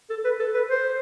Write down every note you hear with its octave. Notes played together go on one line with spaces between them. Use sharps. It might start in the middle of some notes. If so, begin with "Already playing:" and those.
A4
B4
A4
B4
C5